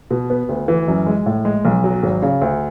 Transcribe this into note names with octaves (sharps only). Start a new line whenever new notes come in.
B2
B3
D2
E3
F#2
G#3
A2
G#3
B1
F#3
G#1
C#3
D2